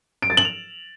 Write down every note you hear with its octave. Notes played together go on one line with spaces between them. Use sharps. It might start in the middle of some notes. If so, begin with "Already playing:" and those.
D7
A6
F#7
F7